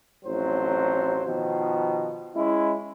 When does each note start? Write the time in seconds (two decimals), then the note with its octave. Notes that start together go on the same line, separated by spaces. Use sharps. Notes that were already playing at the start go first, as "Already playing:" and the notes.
0.25 A1 F2 A2 F#3 C5
1.26 B2 D#3 F3
2.35 G#3 C#4 E4